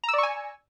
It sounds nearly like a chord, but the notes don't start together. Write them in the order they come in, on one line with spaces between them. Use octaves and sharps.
A#5 E6 D5 C#6 G#5